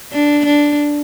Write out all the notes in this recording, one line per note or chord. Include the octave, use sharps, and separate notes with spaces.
D4
D4